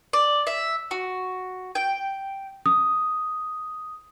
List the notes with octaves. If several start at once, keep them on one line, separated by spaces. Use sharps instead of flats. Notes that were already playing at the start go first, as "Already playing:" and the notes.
D5
E5
F#4
G5
D#6